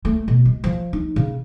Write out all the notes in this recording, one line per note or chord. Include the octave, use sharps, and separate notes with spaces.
A3
B2
G#3
F3
D#4
C#3